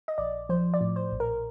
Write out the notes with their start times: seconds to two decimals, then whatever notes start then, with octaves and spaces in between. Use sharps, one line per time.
0.08 D#5
0.18 A#1 D5
0.49 F3 C5
0.74 D5
0.81 A2
0.96 C5
1.12 A#1
1.20 A#4